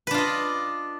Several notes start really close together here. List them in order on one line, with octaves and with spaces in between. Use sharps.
B4 D4 F4 D#5